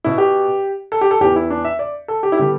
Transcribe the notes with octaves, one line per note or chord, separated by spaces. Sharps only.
B2 B3 E4
G4
A4
G4
A4
E2 E3 B3 G4
E4
D4
E5
D5
A4
G4
E4
D3 G3 B3 G4